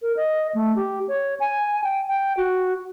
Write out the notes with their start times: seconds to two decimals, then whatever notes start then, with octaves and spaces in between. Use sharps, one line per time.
0.02 A#4
0.17 D#5
0.54 A3
0.76 G4
1.08 C#5
1.40 G#5
1.84 G5
2.07 G5
2.37 F#4